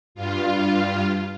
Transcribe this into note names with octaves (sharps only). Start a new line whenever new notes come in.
G2 F4